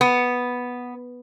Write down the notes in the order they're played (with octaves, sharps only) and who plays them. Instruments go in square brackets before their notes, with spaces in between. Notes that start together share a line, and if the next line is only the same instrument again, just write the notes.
[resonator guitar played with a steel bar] B3